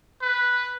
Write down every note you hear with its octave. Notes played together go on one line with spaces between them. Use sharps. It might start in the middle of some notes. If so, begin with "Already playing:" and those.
B4